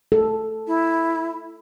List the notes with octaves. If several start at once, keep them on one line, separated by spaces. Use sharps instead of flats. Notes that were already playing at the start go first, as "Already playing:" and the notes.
A4
E4